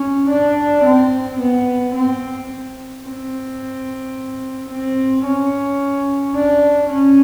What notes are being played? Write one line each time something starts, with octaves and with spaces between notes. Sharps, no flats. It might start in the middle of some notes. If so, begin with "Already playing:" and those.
Already playing: C#4
D4
C4
B3
C4
C4
C4
C#4
D4
C#4